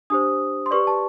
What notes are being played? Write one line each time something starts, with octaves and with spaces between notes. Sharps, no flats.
D4 G4 C5 D#6
C6
G4 B4 D5 C#6
A5